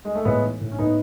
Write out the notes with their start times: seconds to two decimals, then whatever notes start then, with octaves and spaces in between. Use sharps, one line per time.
0.05 G#3
0.15 A3
0.25 A2 G#3 B3
0.43 E3
0.61 A2
0.72 C#4
0.78 A2 B3 D#4